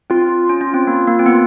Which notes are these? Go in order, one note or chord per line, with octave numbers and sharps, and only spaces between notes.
C4 F4
C#4
C#4
C4
A#3
A#3
C4
B3